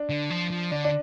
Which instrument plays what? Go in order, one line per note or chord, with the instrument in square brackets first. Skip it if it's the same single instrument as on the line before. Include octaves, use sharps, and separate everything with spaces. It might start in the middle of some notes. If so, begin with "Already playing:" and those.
Already playing: [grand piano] D4
[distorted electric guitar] D3
F3
F3
[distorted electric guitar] D3 [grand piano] D4
[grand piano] D4